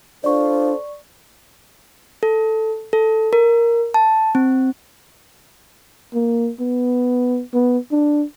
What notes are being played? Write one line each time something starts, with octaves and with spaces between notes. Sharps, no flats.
D4 F4 A4 C5 D5 C#6
A4
A4
A#4
A5
C4
A#3
B3
B3
D4